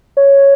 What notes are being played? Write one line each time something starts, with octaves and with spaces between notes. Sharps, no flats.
C#5